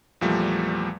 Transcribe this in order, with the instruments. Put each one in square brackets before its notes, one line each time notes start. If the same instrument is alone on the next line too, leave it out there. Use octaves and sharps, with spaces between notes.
[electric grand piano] E2 A#2 F3 G3 A3